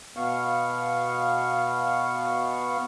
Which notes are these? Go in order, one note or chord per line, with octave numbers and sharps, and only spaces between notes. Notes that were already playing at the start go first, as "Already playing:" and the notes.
B2 B3 F5 C#6